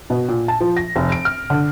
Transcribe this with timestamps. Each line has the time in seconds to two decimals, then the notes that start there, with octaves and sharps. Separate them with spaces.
0.10 B2
0.28 A#2
0.48 A5
0.61 F3
0.77 A#6
0.96 F1
1.12 D7
1.25 F6
1.50 D3